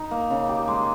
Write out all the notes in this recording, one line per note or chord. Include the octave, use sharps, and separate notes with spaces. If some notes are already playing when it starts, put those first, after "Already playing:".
Already playing: D#4
A#3
C#3
G4
G#3